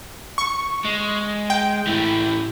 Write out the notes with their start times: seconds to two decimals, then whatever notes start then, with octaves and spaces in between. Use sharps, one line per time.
0.38 C#6
0.85 G#3
1.50 G5
1.87 A2 E3